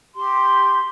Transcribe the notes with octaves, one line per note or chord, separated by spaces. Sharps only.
G4 C6